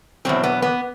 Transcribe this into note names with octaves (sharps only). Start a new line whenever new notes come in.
E2 B2 F#3 C4
B3
B3